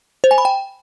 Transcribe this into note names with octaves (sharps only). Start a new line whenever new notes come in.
C5
G#5
B5
G5